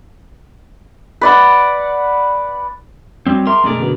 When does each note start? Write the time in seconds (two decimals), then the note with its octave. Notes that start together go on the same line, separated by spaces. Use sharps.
1.21 B4 D5 F#5
3.26 F#3 G3 C4
3.47 A#4 E5 C6 D6
3.64 F#2 B2 G#3 A3 D5
3.79 D3 B3 F#4